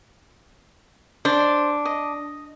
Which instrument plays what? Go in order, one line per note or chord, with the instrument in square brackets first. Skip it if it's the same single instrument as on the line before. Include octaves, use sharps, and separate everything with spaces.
[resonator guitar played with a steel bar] D4 [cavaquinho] C5
[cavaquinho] D#5